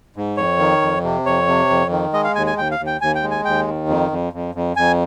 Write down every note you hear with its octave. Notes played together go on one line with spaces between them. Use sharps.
G#2
F2 C#5
D#3
F2
C3
F2 C#5
C3
F2
D#3
G#3 D#5
F5
D#2 G#5
G#5
D#2 G5
F5
D#2
G5
D#2 G#5
G5
G#3
G#5
D#2 G5
D#3
F2
F2
F2
F2
F2 G#5